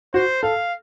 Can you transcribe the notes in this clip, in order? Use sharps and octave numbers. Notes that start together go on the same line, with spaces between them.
F#4 C5
A4 F5